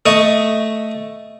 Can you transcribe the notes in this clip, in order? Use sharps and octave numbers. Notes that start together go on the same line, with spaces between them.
A3 D#5 C#6